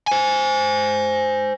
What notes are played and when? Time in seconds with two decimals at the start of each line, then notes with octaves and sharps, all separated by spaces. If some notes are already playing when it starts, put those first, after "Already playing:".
0.07 C5 G#5